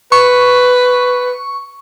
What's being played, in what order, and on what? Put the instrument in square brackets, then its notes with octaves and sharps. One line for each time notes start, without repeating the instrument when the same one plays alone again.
[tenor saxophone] B4 [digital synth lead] C#6